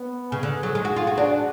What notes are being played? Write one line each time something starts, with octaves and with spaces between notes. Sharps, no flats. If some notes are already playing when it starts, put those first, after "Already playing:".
Already playing: B3
C#3 G#4
D3
F#3
G#3
F#4
F4
F#4
D4 F#4